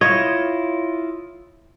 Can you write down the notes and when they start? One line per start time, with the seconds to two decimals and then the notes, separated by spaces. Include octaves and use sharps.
0.01 E4 F4 C#5 D#5